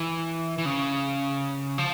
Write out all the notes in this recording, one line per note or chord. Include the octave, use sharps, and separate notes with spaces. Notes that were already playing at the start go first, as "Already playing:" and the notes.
Already playing: E3
E3
C#3
F3